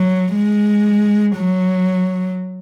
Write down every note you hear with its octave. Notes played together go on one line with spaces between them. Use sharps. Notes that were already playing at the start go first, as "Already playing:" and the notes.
Already playing: F#3
G#3
F#3